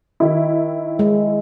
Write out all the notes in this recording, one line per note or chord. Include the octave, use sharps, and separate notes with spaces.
D#3 E4
G#3